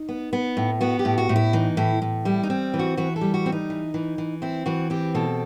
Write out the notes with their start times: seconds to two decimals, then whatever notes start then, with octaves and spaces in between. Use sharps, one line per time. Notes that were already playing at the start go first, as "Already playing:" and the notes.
Already playing: D#4
0.09 B3
0.33 B3
0.57 A2
0.81 B3 F#4
0.99 G4
1.05 A2
1.18 F#4
1.29 A2
1.36 E4
1.53 E3 D#4
1.77 A2 E4
2.02 A2
2.25 G3 E4
2.43 D#4
2.50 C4
2.74 E3
2.79 F#4
2.97 E3 F#4
3.16 A4
3.21 G3
3.34 F#4
3.46 C4
3.52 D#4
3.70 E3
3.94 E3
4.18 E3
4.42 C4 E4
4.66 E3 F#4
4.90 C4 G4
5.15 B2 A4